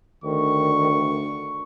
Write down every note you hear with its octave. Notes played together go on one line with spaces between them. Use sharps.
D2 D#3 C#6